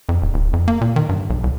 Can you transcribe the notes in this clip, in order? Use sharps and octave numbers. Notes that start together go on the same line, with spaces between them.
F2
D1
D1
F2
A#3
A#2
D#3
G2
B1
C2